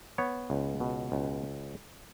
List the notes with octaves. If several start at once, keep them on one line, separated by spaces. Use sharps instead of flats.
B3 C#5
C#2
B2
C#2